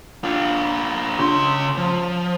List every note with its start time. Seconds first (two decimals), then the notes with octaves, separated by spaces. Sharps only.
0.23 D4 F4
1.19 C#3 C6
1.77 F3